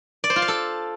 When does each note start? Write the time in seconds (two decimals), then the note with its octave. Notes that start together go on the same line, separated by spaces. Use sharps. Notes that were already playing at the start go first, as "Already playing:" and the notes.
0.24 D5
0.30 C5
0.36 F4
0.42 F5
0.48 A4